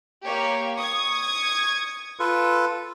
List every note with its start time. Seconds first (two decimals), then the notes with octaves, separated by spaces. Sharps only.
0.25 A#3 G4 C#5
0.77 C#6 D#6 G#6
2.20 F4 A4 B4